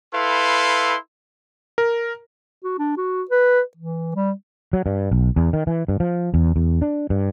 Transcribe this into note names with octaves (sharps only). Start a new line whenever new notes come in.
E4 A4 B4 F5 C6
A#4
F#4
D4
F#4
B4
E3
G3
F#3
G2
B1
E2
D#3
E3
G2
F3
E2
E2
D4
G2